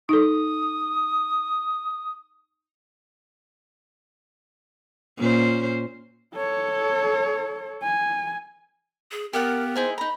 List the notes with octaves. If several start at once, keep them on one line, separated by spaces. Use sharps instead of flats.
D#4 A4 D#6
A#2 C#4 C5
A4 C#5
G#5
G#4
B3 G4 A#4 F5 F#5
D#4 E4 G#4 C5
D#4 A#5 B5